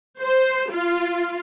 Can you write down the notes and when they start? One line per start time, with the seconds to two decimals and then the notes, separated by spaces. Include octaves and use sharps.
0.21 C5
0.71 F4